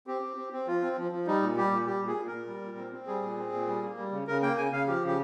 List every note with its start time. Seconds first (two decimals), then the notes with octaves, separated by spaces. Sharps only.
0.07 C4 G4
0.22 C4
0.37 C4
0.53 C4
0.67 F3 F4
0.82 C4
0.97 F3
1.12 F3
1.27 G3 D#4
1.42 A#2
1.57 G3 G4
1.72 A#2
1.87 G3 G4
2.02 A#2 G#4
2.17 A#2
2.27 A#4
2.32 A#2
2.47 G3
2.62 A#2
2.77 C4
2.92 C4
3.07 G3 G#4
3.22 A#2
3.37 C4
3.53 A#2
3.67 G3
3.83 A#3
3.97 G3
4.12 C#3
4.27 C#3 A#4
4.42 A#3 G5
4.57 C#3 G#5
4.72 C#3 F5
4.87 F3 G4
5.03 C#3 G4